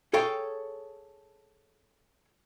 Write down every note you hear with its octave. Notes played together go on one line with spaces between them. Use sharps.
G#4 A4 C#5 F5 G5